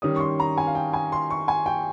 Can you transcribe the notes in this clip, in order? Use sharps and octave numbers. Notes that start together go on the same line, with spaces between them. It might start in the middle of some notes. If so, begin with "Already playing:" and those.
D#3 G3 C#4 D#6
C#6
C6
A#5
G#5
F5
G5
G#5
C6
C#6
G#5
G5